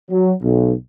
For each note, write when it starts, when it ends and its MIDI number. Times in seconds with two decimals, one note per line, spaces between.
0.10 0.32 54
0.42 0.72 35